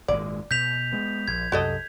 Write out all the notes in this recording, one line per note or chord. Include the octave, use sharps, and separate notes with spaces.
G#1 A#2 G#3 D5
B2 G6 B6 F7
G#3 B3
A#1 G#6
C2 F#2 F#4 A4 D#5